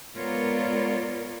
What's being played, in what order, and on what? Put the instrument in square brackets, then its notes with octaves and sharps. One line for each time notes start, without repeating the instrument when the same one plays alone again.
[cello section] G#3 B3 F4 A#4 C#5 D5